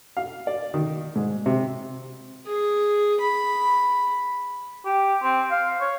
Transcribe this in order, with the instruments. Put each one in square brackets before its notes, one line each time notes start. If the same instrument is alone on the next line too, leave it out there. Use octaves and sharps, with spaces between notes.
[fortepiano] F5
D5
D#3
G#2
C3
[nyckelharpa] G#4
B5
[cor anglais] G4
C4
F5
C#5